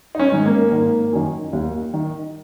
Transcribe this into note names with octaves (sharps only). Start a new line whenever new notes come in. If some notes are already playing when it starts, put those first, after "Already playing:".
D#4
C#4
G#2 D#3
A#3
G#1
F#2 D#3
D#2
D#3